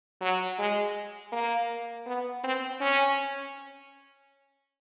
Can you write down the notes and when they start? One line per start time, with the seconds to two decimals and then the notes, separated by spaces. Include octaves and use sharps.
0.21 F#3
0.59 G#3
1.32 A#3
2.07 B3
2.44 C4
2.81 C#4